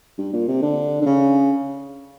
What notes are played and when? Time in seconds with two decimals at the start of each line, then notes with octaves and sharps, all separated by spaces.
0.18 G2
0.33 A#2
0.48 C3
0.62 D3
1.01 D3
1.06 C#3